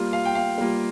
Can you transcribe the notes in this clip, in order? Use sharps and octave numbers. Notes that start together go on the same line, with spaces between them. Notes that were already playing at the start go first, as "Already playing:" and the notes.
Already playing: G3 A#3 F4
F5
G5
F5
G3 A#3 F4